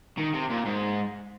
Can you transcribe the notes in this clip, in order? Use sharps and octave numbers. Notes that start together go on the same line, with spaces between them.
D#3
C3
A#2
G#2